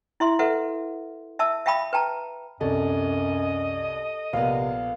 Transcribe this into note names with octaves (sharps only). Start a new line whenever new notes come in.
E4 E5 C6
A4 B4 E5 F#5
E5 A5 E6
E5 F5 G5 A5 B5 D#6
B4 G5 A5 A#5
C2 F#2 A4 D#5
A#1 C3 A#3 B3 F5